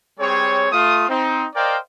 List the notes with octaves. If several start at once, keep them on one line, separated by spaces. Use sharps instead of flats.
G3 C4 G#4 C#5
A3 F4 D#6
C4 D#4
A#4 C5 D5 D#5 F5 G5